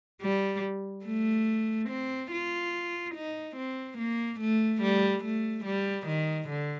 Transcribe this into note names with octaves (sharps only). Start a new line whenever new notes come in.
G3
A3
C4
F4
D#4
C4
A#3
A3
G3
A3
G3
D#3
D3